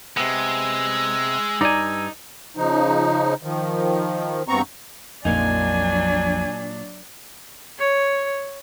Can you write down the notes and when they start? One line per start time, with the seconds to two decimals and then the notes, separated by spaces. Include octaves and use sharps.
0.17 C3 G#3 B3 E6
1.61 G2 D#4 D5 G#5 A#5
2.57 C#3 F3 D#4
3.43 D#3 F3
4.48 E2 G2 B3 C4 A#5 C#6
5.25 A#1 F2 A#2 F#3 A#3 D4 D#4 G#5
7.79 C#5